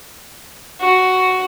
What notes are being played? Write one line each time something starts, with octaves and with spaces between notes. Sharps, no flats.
F#4